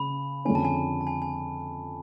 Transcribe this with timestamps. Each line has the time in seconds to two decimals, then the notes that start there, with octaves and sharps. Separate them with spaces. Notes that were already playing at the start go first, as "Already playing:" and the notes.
Already playing: C#3 B5
0.45 F2 D3 G#3 C#4 G#5
0.55 A5
0.65 G#5
1.01 A5
1.07 G#5
1.22 G#5